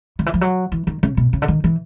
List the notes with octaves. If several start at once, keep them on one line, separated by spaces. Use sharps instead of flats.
D#3
E3
F3
F#3
E3
D#3
C#3
B2
C#3
D3
D#3
E3